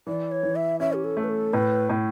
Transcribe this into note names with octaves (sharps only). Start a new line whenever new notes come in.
E3 D5
C#5
E3
E5
C#4 E5
G4
A4
A3
B4
A4
A2 B4
A2